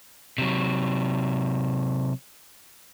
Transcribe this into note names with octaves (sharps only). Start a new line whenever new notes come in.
C3 F#3